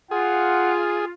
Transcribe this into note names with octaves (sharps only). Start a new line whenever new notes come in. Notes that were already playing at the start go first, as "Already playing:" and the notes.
F4 G#4 F#5